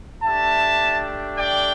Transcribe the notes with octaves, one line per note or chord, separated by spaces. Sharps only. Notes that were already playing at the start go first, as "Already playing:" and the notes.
A3 D4 G4 E5 A5
D5 G5